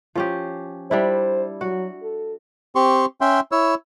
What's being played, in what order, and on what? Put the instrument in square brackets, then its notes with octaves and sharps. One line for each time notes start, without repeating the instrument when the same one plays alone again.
[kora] F3 C#4 G4
[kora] G3 D4 E4 [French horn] C5
[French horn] F#3 [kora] F#4
[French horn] A4
[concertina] C4 G4 C6 C#6
C#4 E5 G5 C6
E4 C#5 E6